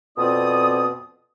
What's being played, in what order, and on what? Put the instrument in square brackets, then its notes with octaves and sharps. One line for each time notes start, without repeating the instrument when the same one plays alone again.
[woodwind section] F2 B2 C4 F4 D5 D#6